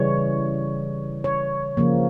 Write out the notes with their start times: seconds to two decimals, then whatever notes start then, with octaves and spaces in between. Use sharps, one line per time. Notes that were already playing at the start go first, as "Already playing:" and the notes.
Already playing: C#3 E3 G3 C#5
1.24 C#5
1.77 C#3 F3 A#3